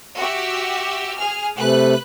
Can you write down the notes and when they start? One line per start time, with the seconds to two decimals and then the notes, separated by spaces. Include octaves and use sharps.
0.16 F#4 G4 E5
1.16 G#4 F6
1.58 C3 A3 B4 F#6